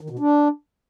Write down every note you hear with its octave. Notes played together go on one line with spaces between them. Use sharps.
D#3
B2
D4